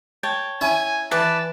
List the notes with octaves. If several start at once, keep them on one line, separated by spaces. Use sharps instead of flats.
C#5 G5 A5
C#4 E4 E5 G#5
E3 B4 D5 A5